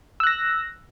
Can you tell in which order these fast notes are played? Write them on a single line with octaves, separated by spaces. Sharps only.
E6 F#6 A#6